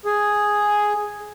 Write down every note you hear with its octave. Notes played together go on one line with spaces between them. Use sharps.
G#4